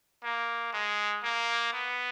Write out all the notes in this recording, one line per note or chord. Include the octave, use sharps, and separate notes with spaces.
A#3
G#3
A#3
B3